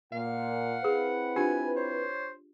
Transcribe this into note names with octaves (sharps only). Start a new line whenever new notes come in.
A#2 F5 F#5
C4 E4 G#4 B4
D4 F4 G4 G#5
C5 C#5